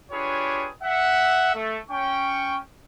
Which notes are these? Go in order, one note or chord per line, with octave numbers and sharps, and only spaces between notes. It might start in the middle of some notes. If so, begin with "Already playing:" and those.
D4 F4 G4 G#4 B4 C#5
E5 F#5
A3
C#4 G5 C#6